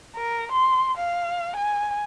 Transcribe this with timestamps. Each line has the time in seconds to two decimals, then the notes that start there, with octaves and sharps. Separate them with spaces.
0.16 A#4
0.52 C6
0.97 F5
1.56 G#5